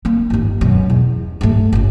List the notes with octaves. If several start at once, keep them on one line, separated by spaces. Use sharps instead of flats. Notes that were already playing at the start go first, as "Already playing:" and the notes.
A#3 D4
G1 D#2
F#2 B2
E2
G2 A3
G1 C#2